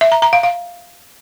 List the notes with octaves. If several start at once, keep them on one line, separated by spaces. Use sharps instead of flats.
E5
A#5
A#5
F5
F5